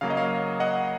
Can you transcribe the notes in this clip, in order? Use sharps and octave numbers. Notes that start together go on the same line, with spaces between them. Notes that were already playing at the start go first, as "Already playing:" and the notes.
C#3 F#3 A#3 F5
D#5
C#5 F5
D#5 F#5